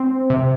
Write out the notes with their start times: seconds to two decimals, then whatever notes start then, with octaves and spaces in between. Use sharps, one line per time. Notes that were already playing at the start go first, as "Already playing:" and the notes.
Already playing: C4
0.30 C3